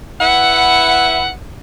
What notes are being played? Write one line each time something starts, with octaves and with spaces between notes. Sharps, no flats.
E4 B4 E5 F#5